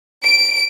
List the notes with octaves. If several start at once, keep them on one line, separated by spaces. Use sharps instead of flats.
D7